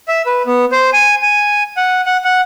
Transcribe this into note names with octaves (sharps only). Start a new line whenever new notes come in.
E5
B4
B3
C5
G#5
G#5
F#5
F#5
F#5